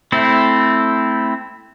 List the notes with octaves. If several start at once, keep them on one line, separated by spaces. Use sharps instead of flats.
A3 C4 E4